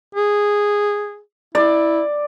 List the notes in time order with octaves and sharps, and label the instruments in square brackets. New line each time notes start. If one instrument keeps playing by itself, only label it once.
[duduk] G#4
[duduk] E4 [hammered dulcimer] D5